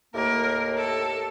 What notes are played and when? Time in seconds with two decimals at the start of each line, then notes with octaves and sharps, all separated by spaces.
0.15 D#2 A2 A#3 A#4
0.78 A4